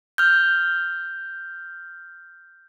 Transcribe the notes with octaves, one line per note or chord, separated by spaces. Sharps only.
F6 G6